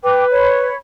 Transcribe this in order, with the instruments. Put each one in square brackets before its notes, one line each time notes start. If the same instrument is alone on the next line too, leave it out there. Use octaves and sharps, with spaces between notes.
[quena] B4 [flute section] G5 D6
[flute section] C#5 B5